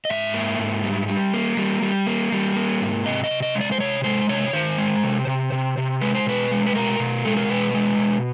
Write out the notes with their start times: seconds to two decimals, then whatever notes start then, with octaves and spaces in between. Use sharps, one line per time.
0.05 D#5
0.09 G#2 E5
0.34 A#3
0.59 G#2
0.84 G3
1.08 G3
1.34 A#3
1.57 G3
1.82 G3
2.07 A#3
2.32 G3
2.56 A#3
2.81 G#2
3.05 C3 D#5
3.24 D#5
3.31 C3
3.42 D#5
3.55 G#3
3.61 D5
3.72 C5
3.80 C3 C#5
4.04 G#3 C5
4.29 C3 C#5
4.53 D#3 C5
4.78 G#3
5.04 C3
5.27 C3
5.52 C3
5.77 C3
6.01 G#3 B4
6.15 C5
6.26 B2 B4
6.51 G#3
6.66 B4
6.75 B2 A#4
7.00 B2
7.25 G#3 A4
7.37 A#4
7.49 B2 B4
7.74 G#3
7.98 B2